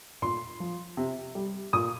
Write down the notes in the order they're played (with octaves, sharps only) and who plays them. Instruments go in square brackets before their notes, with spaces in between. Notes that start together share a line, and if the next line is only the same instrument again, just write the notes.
[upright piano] A#2 C6
F3
C3
G3
A#2 D#6